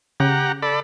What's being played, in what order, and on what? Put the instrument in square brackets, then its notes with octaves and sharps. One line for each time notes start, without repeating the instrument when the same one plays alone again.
[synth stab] C#3 [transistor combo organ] G4 F#5 A#5
[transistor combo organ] A4 D5 B5